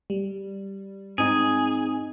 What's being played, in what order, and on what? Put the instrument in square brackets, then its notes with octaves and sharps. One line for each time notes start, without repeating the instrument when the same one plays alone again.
[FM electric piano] G3
[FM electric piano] G#2 [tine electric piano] C4 D#4 [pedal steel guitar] G#4